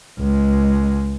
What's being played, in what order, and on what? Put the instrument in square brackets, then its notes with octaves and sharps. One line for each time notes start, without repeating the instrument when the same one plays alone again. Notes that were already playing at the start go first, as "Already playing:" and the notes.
[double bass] C#2 G#3